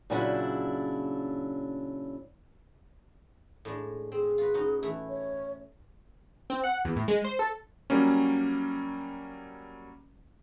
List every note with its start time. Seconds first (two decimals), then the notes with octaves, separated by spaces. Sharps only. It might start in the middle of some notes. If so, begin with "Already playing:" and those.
0.10 A#2 C#3 F#3 D4 E4
3.65 A2 G#3 D4
4.12 C4 G#4
4.38 F4 F#4 B4
4.54 C#4 D#4 F#4
4.82 E3 A3 E4
5.09 C#5
6.50 C4
6.64 F#5
6.85 E2
6.96 A2
7.08 G#3
7.24 C5
7.39 A4
7.90 F#3 G3 A#3 C#4